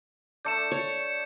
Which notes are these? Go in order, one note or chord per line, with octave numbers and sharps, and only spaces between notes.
A3 D4 D5 G6 C#7 E7
C#5